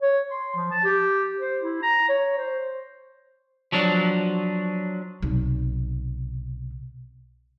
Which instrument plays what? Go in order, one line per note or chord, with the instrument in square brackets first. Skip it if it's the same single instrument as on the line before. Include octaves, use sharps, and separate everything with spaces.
[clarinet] C#5
C6
F3
A5
G4
C5
E4
A#5
C#5
C5
[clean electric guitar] F3 F#3 D4
[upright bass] B1 C3